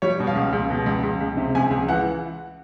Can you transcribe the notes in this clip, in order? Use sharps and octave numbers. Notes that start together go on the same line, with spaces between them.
G3 C#5
B2
F5
C#2
C#2
B2
C#2
C#2
C#2
C3
C#2 G#5
C#2
E3 F#5